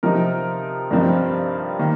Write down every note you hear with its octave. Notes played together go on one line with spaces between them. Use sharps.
C3 F3 C4 D#4 A#4
G2 F3 C4 D#4 A#4
D#3 A#3